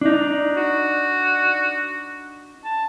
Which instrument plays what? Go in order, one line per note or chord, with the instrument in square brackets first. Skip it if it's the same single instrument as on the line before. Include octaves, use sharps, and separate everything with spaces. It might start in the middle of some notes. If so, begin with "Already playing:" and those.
[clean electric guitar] D4 D#4
[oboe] F#4
A5